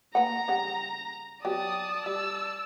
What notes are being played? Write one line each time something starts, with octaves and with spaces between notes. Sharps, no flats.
A#3 B4 F#5 A#5
C#3 G3 F#5
F#3 B3 G4 D5 A5 D#6
G3 E6